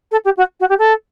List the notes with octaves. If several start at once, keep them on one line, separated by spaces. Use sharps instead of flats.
A4
G4
F#4
F#4
G4
A4